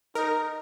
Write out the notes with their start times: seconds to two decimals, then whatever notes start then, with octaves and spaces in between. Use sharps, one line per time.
0.15 D#4 A#4